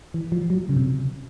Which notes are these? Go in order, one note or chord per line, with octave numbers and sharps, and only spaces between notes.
E3
F3
F#3
C#3
C3